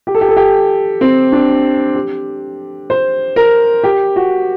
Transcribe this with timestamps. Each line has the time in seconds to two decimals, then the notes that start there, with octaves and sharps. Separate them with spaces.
0.07 G4
0.15 A4
0.21 G4
0.29 A4
0.37 G4
1.01 C4
1.32 D4
1.95 G4
2.90 C5
3.36 A#4
3.84 G4
4.16 F#4